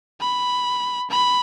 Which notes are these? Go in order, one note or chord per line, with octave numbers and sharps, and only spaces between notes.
B5
B5